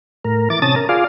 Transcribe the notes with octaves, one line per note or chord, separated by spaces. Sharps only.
A2 A#4
E3 D6 A6
C3 C#4 A5 D#6 A6
A#4
F4 G#4 D5 F5